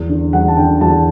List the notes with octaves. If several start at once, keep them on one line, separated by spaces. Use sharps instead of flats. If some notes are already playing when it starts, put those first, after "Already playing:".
Already playing: E2
D3
E2 F#5
A5
D3 G5
E2 A5